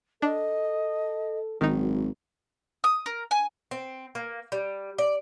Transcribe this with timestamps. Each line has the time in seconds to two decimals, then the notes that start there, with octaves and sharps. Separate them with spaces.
0.22 D4 A4 D#5
1.61 G#1 F#2 D#3 F#3 D#4
2.84 D#6
3.06 A#4
3.31 G#5
3.71 C4
4.15 A#3
4.52 G3
4.98 D5